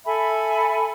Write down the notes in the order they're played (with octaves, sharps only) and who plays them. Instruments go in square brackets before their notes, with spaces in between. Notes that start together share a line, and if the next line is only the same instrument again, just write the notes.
[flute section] A4 E5 G#5 B5